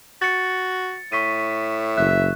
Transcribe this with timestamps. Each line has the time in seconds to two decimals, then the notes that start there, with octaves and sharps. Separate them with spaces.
0.22 F#4 A6 C#7
1.12 A2 C#6 B6 D#7
1.97 F#1 E5 F#6